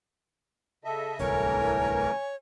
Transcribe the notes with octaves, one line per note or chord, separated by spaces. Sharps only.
C#3 A4 D#5 E5
D1 C2 E3 A3 A#4 C#5 G#5